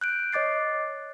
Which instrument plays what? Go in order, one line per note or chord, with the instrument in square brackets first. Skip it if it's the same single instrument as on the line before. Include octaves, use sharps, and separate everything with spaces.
[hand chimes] F#6 G6 D7
C#5 D#5 D6 A6 C7